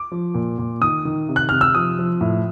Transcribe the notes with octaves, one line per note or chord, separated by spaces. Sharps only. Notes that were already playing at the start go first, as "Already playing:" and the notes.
Already playing: D6
F3
A#2
A#2
D#3 D#6
D#3
C3
F#6
C3 F6
E6
F3 D#6
F3
A2